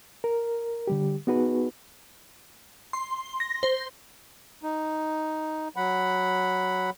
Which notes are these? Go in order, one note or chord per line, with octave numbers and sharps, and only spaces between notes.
A#4
D3 G3 G4
B3 D#4 F#4 G#4 B4
C6
A#6
C5
D#4
F#3 F#5 B5